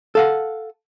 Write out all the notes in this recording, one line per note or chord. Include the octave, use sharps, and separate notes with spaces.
A4 F5 F#5